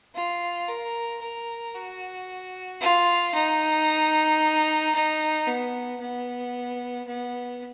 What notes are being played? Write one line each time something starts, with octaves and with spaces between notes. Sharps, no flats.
F4
A#4
A#4
F#4
F4
D#4
D#4
B3
B3
B3